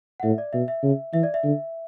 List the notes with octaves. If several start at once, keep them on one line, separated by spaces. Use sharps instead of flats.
F#5
A2 E5
D5
B2 E5
E5
C#3
E3 E5
D5
E5
D3